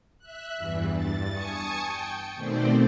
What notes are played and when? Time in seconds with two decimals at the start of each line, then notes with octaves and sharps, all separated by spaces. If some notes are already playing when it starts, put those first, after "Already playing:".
0.19 E5 F#6
0.57 E2 G2 E3
0.94 G2 A6
1.31 G#5 A5 C#6 D#6 C#7
1.82 G5
2.35 B2 D#3 A3 C4 C5 D5